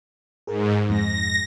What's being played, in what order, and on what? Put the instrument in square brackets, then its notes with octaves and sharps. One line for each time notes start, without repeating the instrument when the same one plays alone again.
[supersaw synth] G#2 [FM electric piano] G#4 A#4
[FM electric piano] F2 G#2 G#3 [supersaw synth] A#6